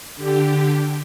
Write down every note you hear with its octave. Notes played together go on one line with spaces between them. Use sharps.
D3 G4